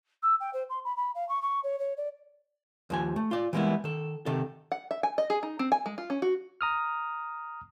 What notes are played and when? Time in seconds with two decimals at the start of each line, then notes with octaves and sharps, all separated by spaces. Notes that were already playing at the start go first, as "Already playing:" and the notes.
0.23 E6
0.40 G5
0.53 C5
0.69 C6
0.84 B5
0.96 B5
1.15 F5
1.29 C#6
1.42 C#6
1.63 C#5
1.79 C#5
1.97 D5
2.90 D#2 F3 G#5
3.16 A3
3.31 F4 D5
3.53 E3 G3 G#3 A#3 B3 E4
3.84 D#3 A4
4.26 C3 D#3 A4
4.72 F#5
4.91 E5
5.03 G#5
5.18 D#5
5.30 G#4
5.43 D#4
5.59 C4
5.72 G#5
5.86 G#3
5.98 F4
6.10 C#4
6.22 F#4
6.61 A#5 D#6 F6